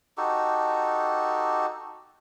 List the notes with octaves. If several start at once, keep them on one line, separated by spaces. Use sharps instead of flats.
D#4 F#4 G4 A4